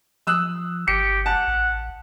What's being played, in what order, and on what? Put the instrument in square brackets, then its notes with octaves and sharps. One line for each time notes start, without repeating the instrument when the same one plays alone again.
[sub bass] F3 [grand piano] D#6 E6 F#6
[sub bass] G1 [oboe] G4 [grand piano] C#7
[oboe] F#5 [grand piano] A5
[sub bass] A1